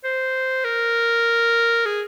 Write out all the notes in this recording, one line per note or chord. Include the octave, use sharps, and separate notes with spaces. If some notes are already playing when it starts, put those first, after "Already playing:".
C5
A#4
G#4